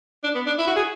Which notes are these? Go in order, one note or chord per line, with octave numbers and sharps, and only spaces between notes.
D4
B3
D4
E4
F#4
G#4